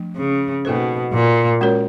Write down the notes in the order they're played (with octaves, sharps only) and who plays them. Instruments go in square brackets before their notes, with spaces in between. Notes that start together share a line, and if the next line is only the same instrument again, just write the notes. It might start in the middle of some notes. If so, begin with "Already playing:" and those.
Already playing: [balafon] F3 A3 D4
[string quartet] C#3
[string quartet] B2 [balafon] A#3 D#4 F#4 A4 C5
[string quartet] A#2
[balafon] G#3 C#4 F#4 A#4 C#5